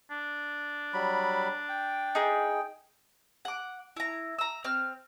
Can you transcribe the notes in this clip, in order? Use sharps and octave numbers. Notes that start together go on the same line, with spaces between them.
D4
F#3 G3 B5
G5
D#4 G#4
F#5 D6
E4 A#5
A#5 E6
C4 F6